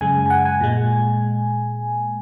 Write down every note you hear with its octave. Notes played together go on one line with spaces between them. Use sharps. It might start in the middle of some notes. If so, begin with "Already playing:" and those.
F#2 C#3 G#3 G#5
G#5
F#5
G#5
A#2 G#3